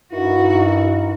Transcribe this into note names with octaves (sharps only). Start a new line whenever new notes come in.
G2 D#4 E4 F#4 A#4